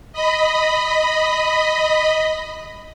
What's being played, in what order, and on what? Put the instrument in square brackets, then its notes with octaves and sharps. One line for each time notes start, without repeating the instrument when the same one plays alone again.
[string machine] D#5 B5